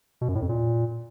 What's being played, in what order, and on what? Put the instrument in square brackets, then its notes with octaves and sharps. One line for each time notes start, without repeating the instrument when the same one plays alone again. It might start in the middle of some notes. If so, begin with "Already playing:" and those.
[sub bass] B2
F#2
A2
F2
A#2